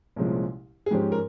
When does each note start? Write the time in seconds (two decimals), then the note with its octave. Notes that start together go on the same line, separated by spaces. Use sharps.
0.16 C2 A#2 F3 G#3 C#4
0.86 G#4
0.91 G#2 F3 G#3 C#4 G4
1.12 A#4